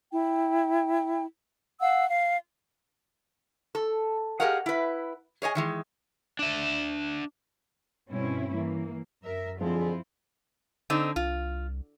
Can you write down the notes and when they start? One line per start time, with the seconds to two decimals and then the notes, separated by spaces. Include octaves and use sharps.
0.11 E4 G5
1.80 F5 F#5 E6
2.07 F5
3.75 A4
4.40 G4 G#4 A#4 D#5 F5 F#5
4.66 E4 B4
5.42 G#4 C#5 D#5 G#5
5.55 D#3 E3 G#3
6.39 D4 E5
8.09 G2 B2 C4 C#4 E4
8.54 E3 A#3
9.24 F#2 A#4 E5
9.61 F2 D3 F3 C4 E4 F4 G#4
10.90 D3 C4 D#4
11.16 C2 F4